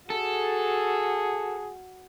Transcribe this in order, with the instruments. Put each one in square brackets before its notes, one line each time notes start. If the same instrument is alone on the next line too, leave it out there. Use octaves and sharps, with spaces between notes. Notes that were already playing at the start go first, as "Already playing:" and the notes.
[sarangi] F#4 [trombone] G#4 [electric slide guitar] A4